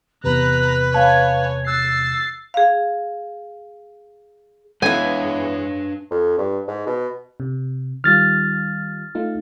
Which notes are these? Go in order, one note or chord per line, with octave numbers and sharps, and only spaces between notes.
E2 C3 B4 A#5 F#6
C#5 F5 G#5 A5
E6 F#6 A6 C7
G#4 F5
E3 G#3 B3 D4 B4 C#5 F5 G#5
F2
G2
G#2
B2
C3
D#3 G3 F4 F6 A6
A3 D#4 F4